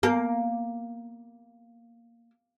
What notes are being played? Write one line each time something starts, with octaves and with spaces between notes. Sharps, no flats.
A#3 B3 A#4